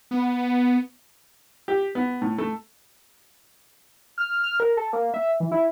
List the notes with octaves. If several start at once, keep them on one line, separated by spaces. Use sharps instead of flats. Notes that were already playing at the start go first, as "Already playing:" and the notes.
B3
G4
B3
A2
A3
F6
F6
A#4
A4
A#3
E5
E3
E4